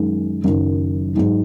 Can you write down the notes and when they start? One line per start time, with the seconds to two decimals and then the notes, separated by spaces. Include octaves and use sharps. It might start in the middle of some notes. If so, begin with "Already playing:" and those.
Already playing: F#2 D#3 G#3 D#4
0.44 F#1 F#2 D#3 F#3
1.15 G#2 F#3 D#4